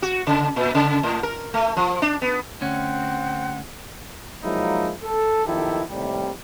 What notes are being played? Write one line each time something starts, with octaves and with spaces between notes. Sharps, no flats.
F#4
C#3
A#2
C#3
A2
A#4
A3
F3
D4
B3
D2 C4 C#4 F#5
F3 F#3 G#3 A#3 D#4 E4
A4
B1 D#3 F3 E4 G4 A4
D#2 A2 C3 G3